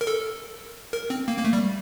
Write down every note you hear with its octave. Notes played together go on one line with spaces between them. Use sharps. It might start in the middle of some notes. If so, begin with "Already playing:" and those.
A#4
A4
A#4
C4
A#3
A#3
A3
G3